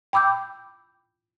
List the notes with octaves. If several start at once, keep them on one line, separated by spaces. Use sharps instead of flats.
G5 B5 D6 E6 G6